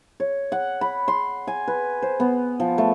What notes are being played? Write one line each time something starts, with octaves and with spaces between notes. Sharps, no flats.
C#5
F#5
B5
C6
G#5
B4
C5
B3
F3
A3